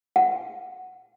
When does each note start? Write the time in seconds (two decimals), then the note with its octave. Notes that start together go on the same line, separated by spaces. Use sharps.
0.16 F#5